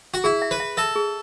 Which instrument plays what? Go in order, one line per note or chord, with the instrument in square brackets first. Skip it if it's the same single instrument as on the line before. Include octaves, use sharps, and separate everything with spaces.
[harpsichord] F#4
[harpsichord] E4 [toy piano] G#4
[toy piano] E5
[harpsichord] B4
[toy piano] E5
[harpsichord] A4 [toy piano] E5
[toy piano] G#4